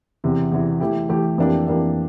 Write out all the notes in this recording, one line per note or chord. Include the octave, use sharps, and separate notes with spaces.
E2 C3 E3
E2 C3 E3
E3 A3 E4 G4
E3 A3 E4 G4
F2 E3 A#3 D4 G4
F2 E3 A#3 D4 G4